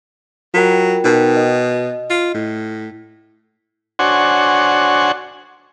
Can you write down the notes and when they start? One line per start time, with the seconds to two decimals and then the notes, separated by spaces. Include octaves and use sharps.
0.54 F#3 F4 A#4 G5
1.04 B2 D#4 A#4 G5
1.37 D#5
2.10 F4
2.34 A2
3.99 D4 F#4 C5 C#5 F#5 G#5